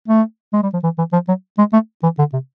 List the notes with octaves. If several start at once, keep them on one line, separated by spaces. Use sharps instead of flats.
A3
G#3
G3
F3
E3
E3
F3
F#3
G#3
A3
E3
D3
C3